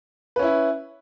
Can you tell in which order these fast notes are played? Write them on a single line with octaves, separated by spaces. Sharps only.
B4 C#4 E4